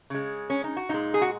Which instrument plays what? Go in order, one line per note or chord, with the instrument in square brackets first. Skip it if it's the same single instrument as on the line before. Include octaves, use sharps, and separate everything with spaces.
[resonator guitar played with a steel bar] C#3 G#3
C#4
D#4
F#4
A#2 G#3 D#4
G#4
F#4